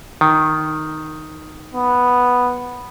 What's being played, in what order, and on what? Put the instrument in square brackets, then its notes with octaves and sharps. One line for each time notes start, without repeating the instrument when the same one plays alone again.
[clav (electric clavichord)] D#3
[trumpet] B3